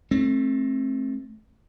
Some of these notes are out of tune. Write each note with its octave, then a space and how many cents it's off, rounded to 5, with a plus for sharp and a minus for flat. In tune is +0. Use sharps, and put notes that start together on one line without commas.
A3 -10 C4 +30